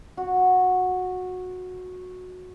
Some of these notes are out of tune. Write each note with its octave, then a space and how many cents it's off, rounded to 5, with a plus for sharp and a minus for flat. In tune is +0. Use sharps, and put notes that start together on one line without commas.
F#4 -15